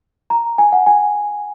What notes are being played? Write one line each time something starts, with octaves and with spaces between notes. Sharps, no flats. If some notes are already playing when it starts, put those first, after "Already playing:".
A#5
G#5
F#5
G#5